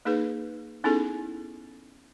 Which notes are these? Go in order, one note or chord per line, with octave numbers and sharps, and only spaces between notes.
A#3 D#4 G#4 B4
B3 C#4 D#4 E4 G#4 A4